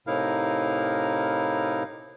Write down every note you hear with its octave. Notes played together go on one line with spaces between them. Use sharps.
A2 C3 D#4 E4 A#4 F5